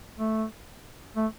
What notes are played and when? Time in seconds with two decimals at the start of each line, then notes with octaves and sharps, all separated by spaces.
0.18 A3
1.16 A3